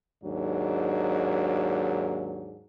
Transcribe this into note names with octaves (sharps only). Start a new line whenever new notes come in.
D#2 G#2 F#3 D4